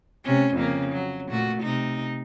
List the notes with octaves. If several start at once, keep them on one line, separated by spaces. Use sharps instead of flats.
C3 A3 C#4
F2 C#3 A#3
F#3
A#2 A3 F#4
C3 D#4